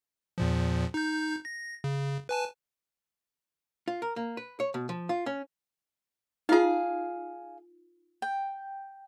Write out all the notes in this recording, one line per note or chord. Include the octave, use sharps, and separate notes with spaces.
E2 A#2 F3
D#4 G6
A#6
C#3
B4 G#5 A5
F4
A#4
A#3
B4
C#5
B2
F3
F4
C#4
D#4 F4 G#4 F5
G5